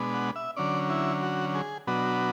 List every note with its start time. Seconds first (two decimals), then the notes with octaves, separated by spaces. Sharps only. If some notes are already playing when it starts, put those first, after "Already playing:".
Already playing: B2 G#3 B3 D4
0.14 F#5
0.36 E5
0.56 D3 F#3 C#4 D5
0.90 E4
1.23 F#4
1.55 G#4
1.87 B2 F#3 B3 D4 F#4